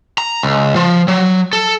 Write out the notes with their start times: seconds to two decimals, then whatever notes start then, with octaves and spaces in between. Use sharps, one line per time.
0.18 A#5
0.43 C#2
0.76 F3
1.08 F#3
1.53 A4